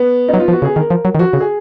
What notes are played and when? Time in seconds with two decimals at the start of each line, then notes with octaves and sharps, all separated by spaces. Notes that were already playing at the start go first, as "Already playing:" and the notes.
Already playing: B3
0.28 D#4
0.34 F#3
0.40 F4
0.48 F3
0.52 F#4
0.62 C#3
0.65 G#4
0.76 D#3 A#4
0.90 F3
1.05 F#3
1.15 D#3
1.19 F3 F#4
1.33 C#3
1.40 G#4